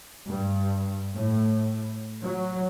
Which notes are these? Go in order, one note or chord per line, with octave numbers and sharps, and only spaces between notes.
G2
A2
F#3